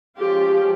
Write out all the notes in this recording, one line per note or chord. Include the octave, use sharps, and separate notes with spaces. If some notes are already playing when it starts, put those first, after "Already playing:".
F3 G#3 C#4 F4 G4